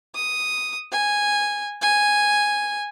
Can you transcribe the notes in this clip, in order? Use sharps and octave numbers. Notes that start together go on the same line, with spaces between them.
D#6
G#5
G#5